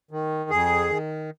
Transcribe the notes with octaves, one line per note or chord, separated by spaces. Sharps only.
D#3
F2 G#4
D#3